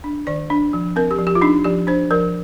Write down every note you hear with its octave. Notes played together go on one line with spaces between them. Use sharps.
D4
D#3 D5
D4
F3
C4 A#4
G4
F3
G4
F4
D4 D#4
F3 G4
D4 C5
F3 A#4